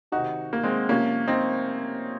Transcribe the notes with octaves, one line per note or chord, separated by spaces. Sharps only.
C3 D#3 D#4 F#4
A#3
G#3 C4
C3 F3 A#3 C#4
C4 D#4